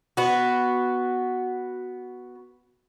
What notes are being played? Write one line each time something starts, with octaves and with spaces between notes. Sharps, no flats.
B3 F#4